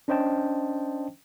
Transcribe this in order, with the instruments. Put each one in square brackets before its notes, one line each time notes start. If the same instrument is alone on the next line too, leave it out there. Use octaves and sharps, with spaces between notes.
[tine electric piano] C#4 D4 C5 D#5 G5 A5